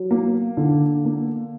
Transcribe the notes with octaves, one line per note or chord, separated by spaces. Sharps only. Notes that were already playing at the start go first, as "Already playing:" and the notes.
Already playing: F#3
A#3
D3
A#3